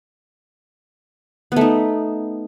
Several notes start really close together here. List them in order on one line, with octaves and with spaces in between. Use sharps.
B3 A3 D#4